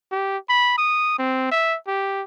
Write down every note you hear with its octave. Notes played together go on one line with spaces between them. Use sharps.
G4
B5
D#6
C4
E5
G4